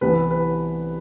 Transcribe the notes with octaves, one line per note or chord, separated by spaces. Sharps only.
C2 C3 E3 B3 B4
B4